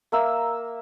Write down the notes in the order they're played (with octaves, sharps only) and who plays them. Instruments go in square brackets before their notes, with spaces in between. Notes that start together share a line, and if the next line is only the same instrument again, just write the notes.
[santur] A#3 E5 A#5 E6